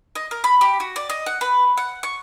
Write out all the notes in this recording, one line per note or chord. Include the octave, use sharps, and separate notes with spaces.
D#5
A#4
B5
G4
F#4
D5
D#5
F#5
B4
F#5
C#6